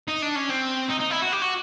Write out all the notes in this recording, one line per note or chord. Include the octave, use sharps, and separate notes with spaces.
D#4
D4
C#4
C4
D#4
D#4
E4
F#4
G4
F#4